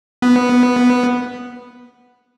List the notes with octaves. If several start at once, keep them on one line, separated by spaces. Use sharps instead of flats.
B3